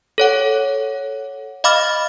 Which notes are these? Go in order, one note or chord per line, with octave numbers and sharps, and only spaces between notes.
A4 C#5 F#5
D#5 F5 B5 D6 F6 A6